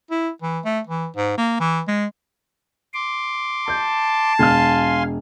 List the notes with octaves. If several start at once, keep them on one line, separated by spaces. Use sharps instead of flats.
E4
E3
A3
E3
G#2
A#3
E3
G#3
C6 D6
A5 G6
E1 F5 G#5 C6 F6